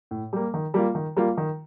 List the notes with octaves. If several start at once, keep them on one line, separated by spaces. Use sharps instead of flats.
A2
G3 A#3
D#3
G3 A#3 F4
D#3
G3 A#3 F4
D#3